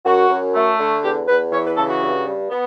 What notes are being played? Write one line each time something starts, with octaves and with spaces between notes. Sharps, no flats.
F#2 F#4
F#2
A3
D3
E2 G4
E2 B4
E3 C#5
B4
C#3 A4
F#4
G2
G2
B3